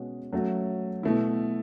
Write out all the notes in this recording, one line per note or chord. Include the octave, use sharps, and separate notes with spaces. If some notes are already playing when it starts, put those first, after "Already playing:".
Already playing: B2 G#3 C#4 F#4
F#3 A3 C#4 F#4
B2 A3 E4